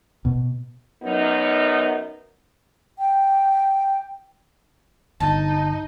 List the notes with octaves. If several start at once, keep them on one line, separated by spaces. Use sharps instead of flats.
B2
F#2 B3 D#4
G5
G1 D#4 A5